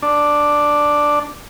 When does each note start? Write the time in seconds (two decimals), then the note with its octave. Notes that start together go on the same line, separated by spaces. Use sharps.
0.02 D4